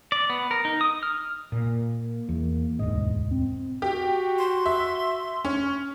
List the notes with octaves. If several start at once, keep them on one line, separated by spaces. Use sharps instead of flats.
D5
B3
A#4
D#4
D#6
F6
A#2 A#3
E2
E1 D2 G#2 D#5
C4
F#4 G4
C6
E5
C#4